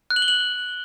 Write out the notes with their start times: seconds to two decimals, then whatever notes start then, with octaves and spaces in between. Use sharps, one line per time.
0.10 F#6
0.16 F#7
0.22 G7
0.28 F#7